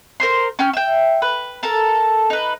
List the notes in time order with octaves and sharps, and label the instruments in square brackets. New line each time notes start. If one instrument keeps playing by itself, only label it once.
[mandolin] A#4 C5 C6
C#4 G5 F6
E5 G5
B4
A4 A#4 A5
D#4 B4